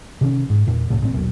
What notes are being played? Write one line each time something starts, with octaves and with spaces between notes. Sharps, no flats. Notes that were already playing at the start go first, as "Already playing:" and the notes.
C3 D#3 C#4
G#2
E2 A#2
C2 A2
A1 A#2 F#3 C4
A#1 D#2 B2 F#3